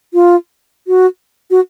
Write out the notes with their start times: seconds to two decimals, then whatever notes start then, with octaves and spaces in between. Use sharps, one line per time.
0.14 F4
0.88 F#4
1.51 F#4